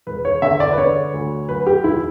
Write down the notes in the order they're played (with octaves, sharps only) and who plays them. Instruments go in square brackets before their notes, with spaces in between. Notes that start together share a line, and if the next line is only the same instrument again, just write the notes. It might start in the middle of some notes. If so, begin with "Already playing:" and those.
[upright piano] E1 B4
C#5
D3 E5
D5
B4
D3 C#5
D2
F#3 B4
G4
E1 E4